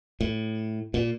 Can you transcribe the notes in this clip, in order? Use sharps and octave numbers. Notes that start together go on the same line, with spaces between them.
A2
A#2